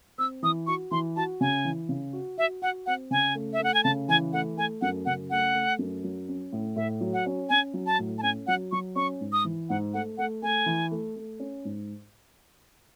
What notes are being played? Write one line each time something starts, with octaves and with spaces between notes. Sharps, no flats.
C4 E6
E3 D#6
F#4 C#6
E3 C6
F#4 A5
C#3 G#5
E3
C#3
F#4
F#4 E5
F#4 F#5
C4 F#5
C#3 G#5
A3
E5
A3 F#5
G#5
C#3 A5
E3 G#5
A3 F#5
A3 G#5
F#2 F#5
C#3 F#5
A3 F#5
A3
F#2
F#3
C#4
A2
A2 E5
F#3
F#5
C#4
C#4 G#5
F#3
A5
A2
A5
C#4 G#5
F#3 F#5
F#3 C#6
C#4 C#6
G#2
D#6
E3
G#2 F#5
A3 F#5
A3 F#5
A3 G#5
E3
A3
A3
C#4
G#2